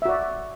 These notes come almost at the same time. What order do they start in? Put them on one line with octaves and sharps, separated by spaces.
E5 F#4 D5